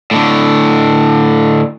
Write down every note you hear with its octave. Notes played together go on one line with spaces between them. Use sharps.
A2 D3